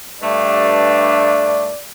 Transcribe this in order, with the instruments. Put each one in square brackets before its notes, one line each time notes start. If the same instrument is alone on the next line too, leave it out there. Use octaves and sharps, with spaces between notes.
[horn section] G2 A3 D4 [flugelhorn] D5